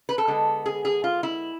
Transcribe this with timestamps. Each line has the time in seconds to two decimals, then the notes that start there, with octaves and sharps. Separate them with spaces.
0.09 B4
0.18 A4
0.28 D3 G#3 B3
0.66 G#4
0.85 G#4
1.04 F4
1.23 E4